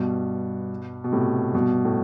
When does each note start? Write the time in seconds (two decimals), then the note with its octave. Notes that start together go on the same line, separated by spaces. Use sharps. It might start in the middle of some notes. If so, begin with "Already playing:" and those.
Already playing: G2 B2
1.04 B2
1.12 A2 C3
1.54 G2 B2
1.85 A2